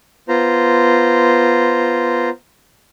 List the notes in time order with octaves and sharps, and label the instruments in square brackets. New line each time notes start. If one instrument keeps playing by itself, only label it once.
[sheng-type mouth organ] B3 F4 C5 A#5